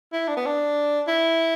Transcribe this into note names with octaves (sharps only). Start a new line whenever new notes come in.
E4
D4
B3
D4
E4